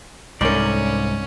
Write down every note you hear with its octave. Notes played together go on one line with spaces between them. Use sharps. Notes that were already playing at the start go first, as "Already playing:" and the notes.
C2 G#2 C#4 D#4 A#4 D5